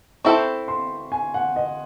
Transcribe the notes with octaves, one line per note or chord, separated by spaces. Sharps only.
C4 E4 A4 C5 C#6
C6
G#5
F#5
D#5